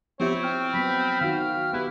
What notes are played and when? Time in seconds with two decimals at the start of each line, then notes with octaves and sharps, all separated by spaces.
0.20 F3 B3 C4 E4 G4 C#5 E5
0.43 G5 F6
0.74 F#3 B3 B5
1.21 D#3 F#4 F5
1.73 B3 E4 G4 B4